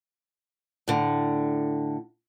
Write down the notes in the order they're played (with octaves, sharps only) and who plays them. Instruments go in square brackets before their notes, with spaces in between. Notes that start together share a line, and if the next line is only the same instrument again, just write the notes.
[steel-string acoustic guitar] A2 D3